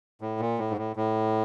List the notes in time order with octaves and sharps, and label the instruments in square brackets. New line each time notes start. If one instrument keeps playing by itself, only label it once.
[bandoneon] A2
A#2
A2
G#2
A2
A2